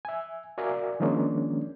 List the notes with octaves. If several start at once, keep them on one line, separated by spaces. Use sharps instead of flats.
E5 G#5
F#4 A#4 D5 E5 F5 G#5
D#3 F3 G#3 A#3 C#4 D4